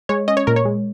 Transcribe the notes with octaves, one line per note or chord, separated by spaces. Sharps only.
G#3 C#5
C#4 D#5
C#5
A#2 A#4
C#5
G#3